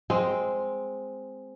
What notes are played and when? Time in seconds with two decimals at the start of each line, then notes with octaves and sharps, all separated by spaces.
0.10 G#3 C4